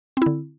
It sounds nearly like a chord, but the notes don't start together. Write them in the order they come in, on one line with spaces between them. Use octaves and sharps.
C4 E4 D3